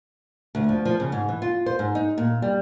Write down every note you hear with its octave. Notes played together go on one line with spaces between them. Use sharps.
D2
F3
F3
C#3
G#2
E3
F4
C5
G#2
D#4
A#2
G3